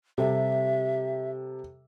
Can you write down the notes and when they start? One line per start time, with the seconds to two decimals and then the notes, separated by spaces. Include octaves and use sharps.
0.18 C3 G3 A4 E5